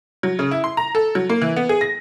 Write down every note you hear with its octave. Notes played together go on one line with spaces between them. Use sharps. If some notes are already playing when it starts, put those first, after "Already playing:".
F#3
C#3
E4
C6
A#5
A4
F#3
A#3
E3
B3
G#4
A#6